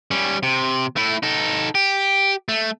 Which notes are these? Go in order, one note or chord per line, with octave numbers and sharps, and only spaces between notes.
G3 C#4
C3
A3 E4
D#4 A4
G4
A3